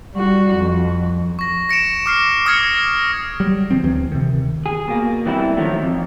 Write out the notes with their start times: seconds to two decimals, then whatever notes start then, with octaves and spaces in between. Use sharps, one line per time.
0.15 G3 F#4
0.56 F2
1.39 C#6 A#6
1.69 A#6 C#7 D7 E7
2.06 D6 F6 C7
2.46 D6 D#6 F6 G#6 A#6 C#7
3.40 F#3 G3
3.71 D3 F3 C4
3.84 D2 E3 C4
4.12 C3 D#3
4.66 G#4
4.88 B2 A#3
5.26 E3 G3 C4 E4
5.57 D#3 F3 F#3 A3
5.83 F2